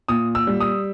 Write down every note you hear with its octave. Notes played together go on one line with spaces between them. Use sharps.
A#2 D#6
E6
G3
D#6